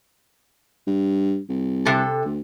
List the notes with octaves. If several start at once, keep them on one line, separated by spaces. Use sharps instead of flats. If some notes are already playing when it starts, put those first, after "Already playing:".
G2
C2
C3 A4
D2